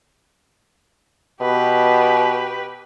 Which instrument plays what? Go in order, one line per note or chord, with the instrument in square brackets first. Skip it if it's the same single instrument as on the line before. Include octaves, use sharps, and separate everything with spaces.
[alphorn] B2 [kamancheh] G4 B4